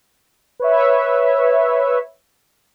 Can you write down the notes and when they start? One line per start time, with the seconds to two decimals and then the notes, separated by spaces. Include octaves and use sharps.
0.60 B4 C#5 E5